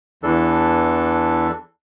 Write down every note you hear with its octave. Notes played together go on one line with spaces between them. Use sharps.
E2 E3 D4 A4